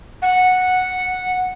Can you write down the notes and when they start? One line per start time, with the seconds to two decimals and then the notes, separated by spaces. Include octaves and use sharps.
0.22 F#5